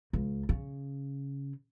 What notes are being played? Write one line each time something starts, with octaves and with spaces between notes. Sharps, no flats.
C#2
C#3